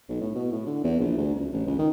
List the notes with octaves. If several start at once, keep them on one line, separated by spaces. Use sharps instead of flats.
B1
A2
B2
A2
D3
E2
A#1
D2
C#2
A1
C#2
D#3